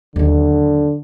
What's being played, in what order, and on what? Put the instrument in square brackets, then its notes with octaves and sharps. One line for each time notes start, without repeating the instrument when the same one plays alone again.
[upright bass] D#2 F#3 [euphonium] D3